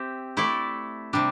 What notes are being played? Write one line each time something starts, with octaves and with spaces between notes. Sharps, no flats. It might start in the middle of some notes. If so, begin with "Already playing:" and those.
Already playing: C4 G4 E5
A3 E4 A4 D5
C3 G3 D4